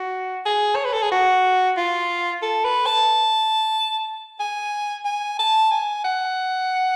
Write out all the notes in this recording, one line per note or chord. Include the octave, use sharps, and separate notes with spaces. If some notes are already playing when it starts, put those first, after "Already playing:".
Already playing: F#4
G#4
C#5
B4
A4
G#4
F#4
F4
A4
B4
A5
G#5
G#5
A5
G#5
F#5